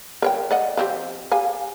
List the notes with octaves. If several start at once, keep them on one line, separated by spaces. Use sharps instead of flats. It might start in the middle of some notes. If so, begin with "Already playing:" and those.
A#4 C#5 G5
D5 D#5 F#5
F3 C4 G4
G4 F5 G#5